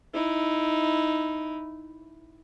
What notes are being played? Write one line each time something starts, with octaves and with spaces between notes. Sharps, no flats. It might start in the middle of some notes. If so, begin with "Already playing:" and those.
D#4 E4